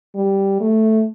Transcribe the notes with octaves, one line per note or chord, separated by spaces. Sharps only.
G3
A3